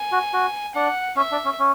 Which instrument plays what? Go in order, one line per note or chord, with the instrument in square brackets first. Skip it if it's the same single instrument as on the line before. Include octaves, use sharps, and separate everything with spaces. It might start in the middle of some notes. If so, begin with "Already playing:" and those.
Already playing: [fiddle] G#5
[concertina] F#4
F#4
[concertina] D4 [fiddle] F#5
[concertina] C#4 [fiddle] E5
[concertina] D4
C#4
C#4